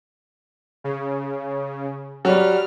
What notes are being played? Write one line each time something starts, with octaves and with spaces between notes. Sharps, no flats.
C#3
F#3 G3 F6